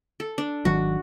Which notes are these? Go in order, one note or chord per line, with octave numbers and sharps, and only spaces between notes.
A4
D4
G#1 D#3 F#3 F#4